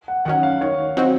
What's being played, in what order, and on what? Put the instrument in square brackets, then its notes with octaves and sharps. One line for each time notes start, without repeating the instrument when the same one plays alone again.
[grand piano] F#5
[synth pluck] D#3 F#3 C#4 [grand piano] F#5
[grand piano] F5
[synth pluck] D#3 [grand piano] C#5
[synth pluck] F#3 C4 D#4 F#4